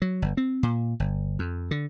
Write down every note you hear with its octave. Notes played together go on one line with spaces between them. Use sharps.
F#3
G1
C4
A#2
G1
F2
D3